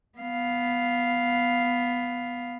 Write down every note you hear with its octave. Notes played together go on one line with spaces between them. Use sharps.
B3 F5